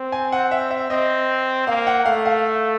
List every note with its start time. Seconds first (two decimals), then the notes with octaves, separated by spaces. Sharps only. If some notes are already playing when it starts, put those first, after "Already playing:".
Already playing: C4
0.12 G#5
0.32 F#5
0.51 E5
0.71 E5
0.90 C4 D#5
1.67 A#3 F5
1.87 F#5
2.05 A3 F5
2.25 F5